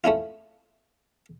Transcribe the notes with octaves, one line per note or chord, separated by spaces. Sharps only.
A3 C#4 E4 F4